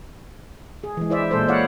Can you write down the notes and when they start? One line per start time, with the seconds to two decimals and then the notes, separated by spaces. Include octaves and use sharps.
0.84 G#4
0.97 E3 G#3
1.10 E4 C5 D5 E5
1.31 A#2 G#3 A4 C5
1.48 E4 C#5 D5 F5 F#5